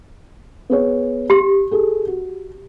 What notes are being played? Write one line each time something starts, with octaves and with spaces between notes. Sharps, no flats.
B3 G#4 C#5
G4 C6
G#4 A4
F#4